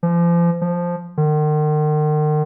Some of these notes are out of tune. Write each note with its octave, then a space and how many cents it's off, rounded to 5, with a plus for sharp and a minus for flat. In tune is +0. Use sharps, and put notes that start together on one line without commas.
F3 -35
F3 +0
D#3 -40